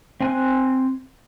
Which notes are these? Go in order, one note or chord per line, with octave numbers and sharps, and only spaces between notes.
C4 G#5 F#6